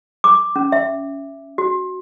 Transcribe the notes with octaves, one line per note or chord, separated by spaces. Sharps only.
D6
C#4
E5
F#4